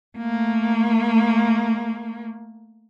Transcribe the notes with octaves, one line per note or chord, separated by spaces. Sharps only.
A3 A#3